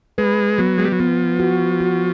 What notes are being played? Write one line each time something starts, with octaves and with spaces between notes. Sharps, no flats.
G#3 B4
F#3 B3
G#3
G3
F#3
F3 B3
F#4
F#4